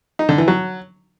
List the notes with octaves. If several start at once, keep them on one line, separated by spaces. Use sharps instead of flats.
D#4
D3
E3
F#3